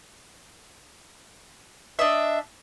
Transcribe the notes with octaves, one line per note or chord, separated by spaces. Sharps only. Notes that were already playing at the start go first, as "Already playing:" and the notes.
D4 D#5 E5